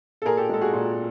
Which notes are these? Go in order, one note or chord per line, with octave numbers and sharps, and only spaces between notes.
A4
A#2 G#4 A#4
G4 A4
G#3 A4
F#4 G#4
A#2